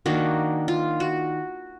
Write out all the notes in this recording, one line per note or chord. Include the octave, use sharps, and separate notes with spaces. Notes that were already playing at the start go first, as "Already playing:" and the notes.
D#3 A#3 D4 F#4
F4
F#4